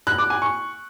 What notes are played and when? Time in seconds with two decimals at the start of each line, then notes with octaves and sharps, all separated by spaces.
0.07 F#6
0.18 D6
0.30 G#5
0.42 C#6